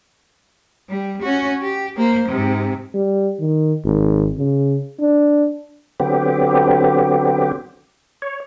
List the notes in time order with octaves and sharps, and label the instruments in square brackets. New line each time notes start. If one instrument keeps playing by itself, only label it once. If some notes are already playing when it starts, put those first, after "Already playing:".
[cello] G3
C#4 F#4
G4
A#3 C5
G#2 C3
[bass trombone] G3
D#3
G#1
C#3
D4
[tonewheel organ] D3 F#3 B3 C4 G4
C#5